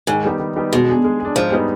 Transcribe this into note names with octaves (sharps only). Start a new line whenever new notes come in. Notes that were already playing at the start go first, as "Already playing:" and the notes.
G#2 D#3
G3 B3 D#4 G4
D#3
G3 B3 D#4 G4
B2 G#3
D4 G#4
G#3
D4 G#4
G#2 F3
G3 B3 D#4 G#4